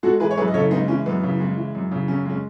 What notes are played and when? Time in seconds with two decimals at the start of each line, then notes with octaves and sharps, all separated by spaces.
0.03 G#3 F#4 A4
0.20 E3 G#4 B4
0.31 C#5
0.37 F#2 G#4 B4
0.48 D#5
0.54 C#3 A4 C#5
0.71 G#3 B3 D#4
0.88 E3 C#4
1.06 F#2 B3
1.23 C#3
1.40 G#3
1.57 E3
1.75 F#2
1.91 C#3
2.08 F#2 C#4
2.25 G#3 C#4